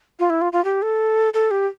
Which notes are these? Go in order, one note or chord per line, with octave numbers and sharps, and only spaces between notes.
F4
E4
F4
F4
G4
A4
A4
G4